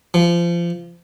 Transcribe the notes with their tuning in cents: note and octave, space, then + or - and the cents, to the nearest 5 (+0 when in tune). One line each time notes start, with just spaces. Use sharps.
F3 -25